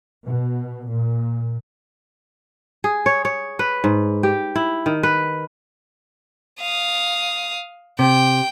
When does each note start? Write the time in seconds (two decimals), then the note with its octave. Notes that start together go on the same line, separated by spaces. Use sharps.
0.25 B2
0.90 A#2
2.84 G#4
3.06 C#5
3.25 C#5
3.59 B4
3.84 G#2
4.23 G4
4.56 E4
4.86 D#3
5.03 B4
6.61 F5 D#6
7.99 C3 G5